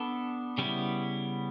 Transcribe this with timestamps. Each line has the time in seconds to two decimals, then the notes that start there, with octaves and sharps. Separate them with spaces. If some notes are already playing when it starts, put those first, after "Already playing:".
Already playing: B3 D4 A4
0.58 C#3 G3 B3 E4